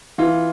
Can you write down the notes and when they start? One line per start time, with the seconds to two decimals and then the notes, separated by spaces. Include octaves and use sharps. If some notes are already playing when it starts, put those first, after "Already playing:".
0.18 E3 F4